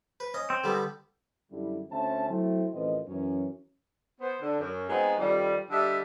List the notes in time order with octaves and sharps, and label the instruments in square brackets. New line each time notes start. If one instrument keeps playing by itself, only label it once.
[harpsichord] B4
C#4 D#5
[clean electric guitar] C4
[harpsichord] D3 G3 B3
[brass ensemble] F#2 D3 G3 E4
D2 C4 C#4 E5 A5
F#3 A3 C4 E4
A1 F3 C4 A#4 B4 D#5
F#2 E3 C#4
[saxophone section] B3 C5
D3
F#2
G#3 B3 C4 D#4
F2 D#3 G3
D3 G3 D#5 E5